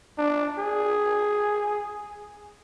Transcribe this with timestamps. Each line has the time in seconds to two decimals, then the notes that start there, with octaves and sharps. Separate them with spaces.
0.18 D4
0.59 G#4